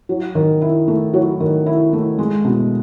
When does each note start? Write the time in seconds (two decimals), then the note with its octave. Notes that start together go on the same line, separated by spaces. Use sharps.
0.09 F#3
0.35 D#3
0.61 E4
0.88 A3
1.14 F#3
1.40 D#3
1.66 E4
1.93 A3
2.19 G#3
2.45 B2